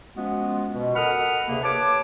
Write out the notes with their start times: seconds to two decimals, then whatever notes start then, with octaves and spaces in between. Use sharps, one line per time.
0.16 F3 G#3 B3 C#4 F4 F#4
0.73 B2
0.95 A4 A#4 F#5 B5 D#6 F6
1.47 D2 C3 A#3 G#4
1.64 B4 C#5 A5 D6